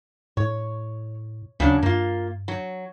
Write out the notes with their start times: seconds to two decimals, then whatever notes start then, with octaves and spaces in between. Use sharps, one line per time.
0.37 A2 C#5
1.60 D#2 C#3 F#3 D4
1.83 G2 A#3 F4
2.48 F#3